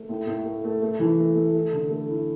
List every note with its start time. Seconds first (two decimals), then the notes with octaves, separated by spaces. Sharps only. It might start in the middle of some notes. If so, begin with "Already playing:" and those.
Already playing: A3
0.09 A2
0.27 A2
0.45 A3
0.64 A3
0.82 A3
1.00 E3
1.19 A3
1.36 A3
1.54 A3
1.73 D3
1.90 A3
2.09 E4